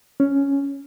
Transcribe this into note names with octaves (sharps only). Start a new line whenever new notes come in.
C#4